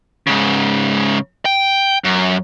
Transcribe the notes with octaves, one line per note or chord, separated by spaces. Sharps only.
G#2 C#3
G5
F#2